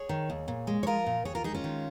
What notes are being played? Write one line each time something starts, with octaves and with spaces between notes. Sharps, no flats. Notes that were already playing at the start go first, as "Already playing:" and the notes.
Already playing: G#4 C#5
D#3
D#2
A#2
G#3
C#5
F3 F4 A#4
A#2
D#2 G#4 C#5
F4 A#4
G#3 D#4 G#4
C#4 F4
D#3